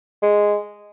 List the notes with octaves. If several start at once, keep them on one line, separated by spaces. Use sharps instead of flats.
G#3